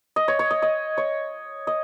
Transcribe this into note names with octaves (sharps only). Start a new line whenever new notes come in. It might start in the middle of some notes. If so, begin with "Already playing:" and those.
D#5
C#5
C#5
D#5
D#5
C#5
D#5